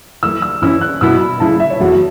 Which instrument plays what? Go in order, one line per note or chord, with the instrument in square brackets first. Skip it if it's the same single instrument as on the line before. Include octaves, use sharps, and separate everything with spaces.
[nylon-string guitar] E3 A3 E4 [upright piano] E6
[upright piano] E6
[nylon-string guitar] E3 C#4 E4 [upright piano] E6
[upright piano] F#6
[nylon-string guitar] B2 B3 E4 [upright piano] E6
[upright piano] B5
[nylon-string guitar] C#3 A3 E4 [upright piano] A5
[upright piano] E5
C#5
[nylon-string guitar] E2 E3 A3 F#4 [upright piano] E5